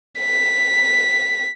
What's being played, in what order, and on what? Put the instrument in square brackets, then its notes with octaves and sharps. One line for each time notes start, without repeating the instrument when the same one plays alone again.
[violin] B6